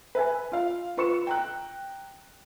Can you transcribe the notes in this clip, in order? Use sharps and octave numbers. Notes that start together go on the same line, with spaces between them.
B4 E5 G#5
F4 F5
F4 B4 C#6 C#7 E7
G5 A#5 F#6